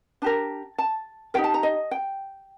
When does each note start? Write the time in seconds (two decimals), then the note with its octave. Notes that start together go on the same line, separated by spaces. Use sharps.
0.22 D4 G4 A#4 A5
0.78 A5
1.34 D#4 G4 A#4 G5
1.44 A5
1.54 A#5
1.63 D#5
1.91 G5